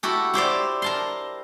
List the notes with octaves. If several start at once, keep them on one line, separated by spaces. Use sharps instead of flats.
E4 F#4 G4 A4
E4 G4 C5 D5
A#4 A5 C6